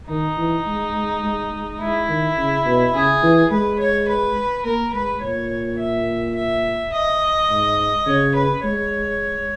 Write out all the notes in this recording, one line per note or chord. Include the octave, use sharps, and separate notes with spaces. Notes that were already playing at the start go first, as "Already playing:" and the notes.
D#3 D#4
E3
G#3
G#3
G#3
G#3
G#3 E4
D#3
C#3
B2
C#3 G#4
E3
G#3 B4
C#5
B4
A#3 A#4
G#3 B4
A#2 C#5
E5
E5
D#5
G#2
C#3 C#5
B4
G#3 C#5